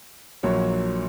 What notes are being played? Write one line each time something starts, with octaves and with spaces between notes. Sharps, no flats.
A#1 A#2 F#3 C#5